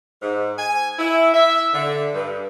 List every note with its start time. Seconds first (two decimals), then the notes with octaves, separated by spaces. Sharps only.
0.22 G#2
0.59 G#5
0.99 E4
1.34 E5
1.73 D3
2.14 G2